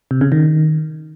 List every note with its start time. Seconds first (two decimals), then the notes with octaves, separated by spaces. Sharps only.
0.11 C3
0.21 C#3
0.32 D#3